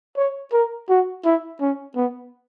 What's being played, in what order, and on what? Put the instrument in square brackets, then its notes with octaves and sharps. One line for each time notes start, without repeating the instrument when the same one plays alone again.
[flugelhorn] C#5
A#4
F#4
E4
C#4
B3